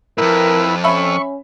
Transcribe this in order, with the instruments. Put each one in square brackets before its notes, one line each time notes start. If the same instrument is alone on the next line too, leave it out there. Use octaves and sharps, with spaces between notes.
[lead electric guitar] F2 G#2 [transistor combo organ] E4 B4 [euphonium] A#4
[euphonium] C#4 [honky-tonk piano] E5 B5 [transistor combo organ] C#6